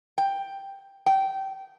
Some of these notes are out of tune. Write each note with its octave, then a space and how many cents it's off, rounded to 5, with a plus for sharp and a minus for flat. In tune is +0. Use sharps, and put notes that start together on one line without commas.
G5 +5
G5 -20